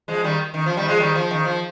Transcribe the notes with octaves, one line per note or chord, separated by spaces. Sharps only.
F3 G#3
D#3 G3
D#3
F3
D#3 G3
F3 G#3
D#3 G3
F3
D#3
F3